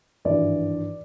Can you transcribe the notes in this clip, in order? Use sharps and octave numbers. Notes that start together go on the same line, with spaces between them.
G#1 G2 E3 D5